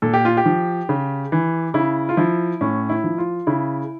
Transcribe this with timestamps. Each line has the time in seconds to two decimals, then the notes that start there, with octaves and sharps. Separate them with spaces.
0.02 A#2 A4
0.14 G4
0.25 F4
0.37 G4
0.46 F3
0.89 C#3
1.32 E3
1.74 C#3 E4
2.09 F4
2.17 F3 E4
2.61 A2 C#4
2.89 E4
3.04 F3
3.18 F4
3.47 C#3 E4